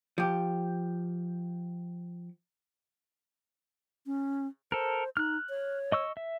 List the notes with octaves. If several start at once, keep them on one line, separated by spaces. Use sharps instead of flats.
F3 G4
C#4
A4 A#4 C5
D#4 F6 F#6
C#5
D#5 C#6 E6
E5